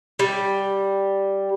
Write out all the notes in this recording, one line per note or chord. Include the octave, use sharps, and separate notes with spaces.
G3